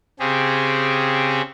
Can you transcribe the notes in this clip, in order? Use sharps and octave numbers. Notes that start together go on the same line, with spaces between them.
C#3 C4 G4 G#4